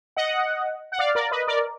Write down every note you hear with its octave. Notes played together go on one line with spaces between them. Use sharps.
D#5 F#5
F#5
D5 F5
A#4 D5
B4 D#5
A#4 D5